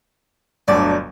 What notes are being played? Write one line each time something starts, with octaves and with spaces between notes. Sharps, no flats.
G1 D2 F#3 D4 D5